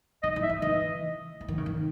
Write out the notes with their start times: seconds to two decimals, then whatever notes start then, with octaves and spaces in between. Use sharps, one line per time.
0.23 D#3 D#5
0.36 E3
0.43 E5
0.49 D#3
0.62 E3 D#5
1.41 E3
1.48 D#3
1.58 C#3
1.66 D#3